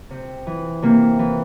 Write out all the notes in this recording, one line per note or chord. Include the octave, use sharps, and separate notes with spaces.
C3
E3
C3 A#3
E3